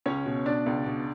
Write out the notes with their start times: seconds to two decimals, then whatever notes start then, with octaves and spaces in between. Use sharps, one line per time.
0.06 C#2 C#4 C#5
0.26 B2
0.46 B2 D4 D5
0.66 C#2
0.86 B2